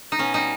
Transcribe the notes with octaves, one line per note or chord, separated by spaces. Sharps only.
D#4
B2 C#4
G3 D#4